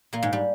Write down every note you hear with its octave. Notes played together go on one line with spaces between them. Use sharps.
A#2 A#3
G#2 G#3
G3